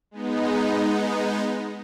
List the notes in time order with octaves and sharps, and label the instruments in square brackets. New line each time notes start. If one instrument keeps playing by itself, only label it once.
[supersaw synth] G#3 B3 D#4